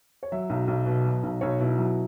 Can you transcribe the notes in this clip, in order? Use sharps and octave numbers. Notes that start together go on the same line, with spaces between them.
C#5
F#3 E5
B1
B1
B2
F#3
B1
B1 C#5
B2 E4
F#3 E4